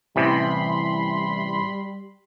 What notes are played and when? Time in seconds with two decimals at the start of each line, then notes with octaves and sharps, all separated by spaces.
0.16 A1 C3 E3 G3 B5 C6